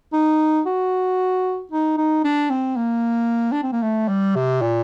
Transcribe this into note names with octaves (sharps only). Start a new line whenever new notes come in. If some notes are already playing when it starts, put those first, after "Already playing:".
D#4
F#4
D#4
D#4
D4
C4
A#3
D4
C4
A#3
A3
G3
C3
A#2